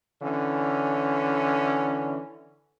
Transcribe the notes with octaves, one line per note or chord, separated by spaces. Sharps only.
D3 E3 C#4